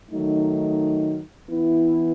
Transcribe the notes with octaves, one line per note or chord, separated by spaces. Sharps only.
D#3 F#3 A3 D#4
E3 B3 E4